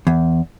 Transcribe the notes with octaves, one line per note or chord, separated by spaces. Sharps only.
E2